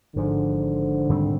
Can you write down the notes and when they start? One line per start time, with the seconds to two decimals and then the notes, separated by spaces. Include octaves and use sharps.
0.15 G#1 G#2 D3 F3
1.09 G#2 D#3 G3 C4